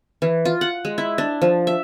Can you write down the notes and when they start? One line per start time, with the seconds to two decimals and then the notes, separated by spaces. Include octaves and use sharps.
0.22 E3
0.45 F4
0.61 F#5
0.85 G#3
0.98 E4
1.18 D4
1.42 F3
1.67 E5